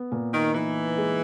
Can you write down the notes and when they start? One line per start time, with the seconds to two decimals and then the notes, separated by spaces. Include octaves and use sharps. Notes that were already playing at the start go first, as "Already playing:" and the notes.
Already playing: B3
0.12 A#2
0.34 D#3
0.54 E3 D#4
0.97 G#3